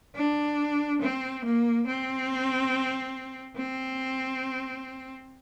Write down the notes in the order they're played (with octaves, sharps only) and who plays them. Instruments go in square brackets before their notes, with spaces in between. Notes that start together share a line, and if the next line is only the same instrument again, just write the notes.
[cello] D4
C4
A#3
C4
C4